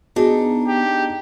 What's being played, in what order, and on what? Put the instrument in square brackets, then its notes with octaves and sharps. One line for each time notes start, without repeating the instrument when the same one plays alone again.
[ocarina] B3 [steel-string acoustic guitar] D4 D#4 [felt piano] F#4 G#4
[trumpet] G4